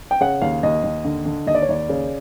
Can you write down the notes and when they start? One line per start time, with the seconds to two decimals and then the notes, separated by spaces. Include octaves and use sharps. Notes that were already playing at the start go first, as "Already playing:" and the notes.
0.11 G5
0.21 C#3 F#5
0.42 D#2 F5
0.63 D#2 D#5
0.83 D#2
1.05 D3
1.25 D3
1.46 D#2 D#5
1.55 D5
1.62 C#5
1.68 D#2 D5
1.89 C#3